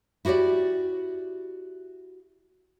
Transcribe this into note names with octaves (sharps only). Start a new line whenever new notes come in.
E4 F#4 G4 A#4 D5